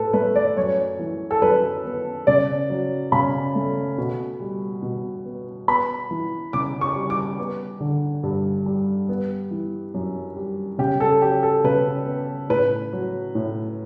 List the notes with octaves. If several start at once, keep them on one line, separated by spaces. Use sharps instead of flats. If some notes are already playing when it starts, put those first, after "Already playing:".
Already playing: A2 A4 B4
A3 B4
D5
F#2 C#5
E3
A4
F#2 B4
B3
C#3 D5
F#3
C#3 B5
A3
B2
G3
B2
B3
B3 B5
E3
C#3 D6
C#6
G3
D6
B3
D3
G2
G3
B3
E3
F#2
G3
C#3 G4
A4
F#3 G4
A4
C#3 B4
B3
A2 B4
F#3
A2